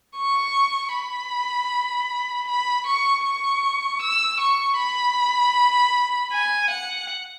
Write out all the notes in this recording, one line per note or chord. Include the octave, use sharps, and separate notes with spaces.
C#6
B5
B5
C#6
C#6
E6
C#6
B5
G#5
F#5